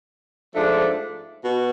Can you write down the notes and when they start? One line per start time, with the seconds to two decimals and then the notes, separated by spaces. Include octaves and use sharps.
0.53 G#2 F3 A3 D4
1.42 B2